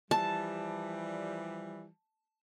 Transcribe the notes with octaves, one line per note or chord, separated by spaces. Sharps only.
E3 F3 G3 A5